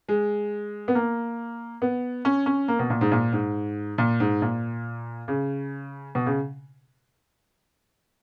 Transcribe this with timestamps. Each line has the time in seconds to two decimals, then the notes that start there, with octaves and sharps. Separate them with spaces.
0.09 G#3
0.88 B3
0.95 A#3
1.82 B3
2.25 C#4
2.46 C#4
2.68 A#3
2.79 B2
2.90 A#2
3.01 G#2
3.12 A#2
3.33 G#2
3.98 A#2
4.20 G#2
4.42 A#2
5.28 C#3
6.15 B2
6.26 C#3